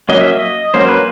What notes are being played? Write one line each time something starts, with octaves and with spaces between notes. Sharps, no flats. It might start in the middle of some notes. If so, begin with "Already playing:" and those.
F#3 A#3 C#4 D#5
E5
D#5
F#3 A#3 C#4 C5
B4